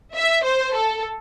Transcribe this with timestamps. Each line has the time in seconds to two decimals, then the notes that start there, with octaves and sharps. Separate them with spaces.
0.14 E5
0.44 C5
0.75 A4